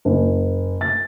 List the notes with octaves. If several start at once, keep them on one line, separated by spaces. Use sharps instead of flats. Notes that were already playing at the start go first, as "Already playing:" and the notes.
F#1
A6